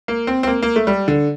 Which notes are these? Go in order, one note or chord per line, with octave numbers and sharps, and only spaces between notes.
A#3
C4
C4
A#3
A#3
A3
G3
D3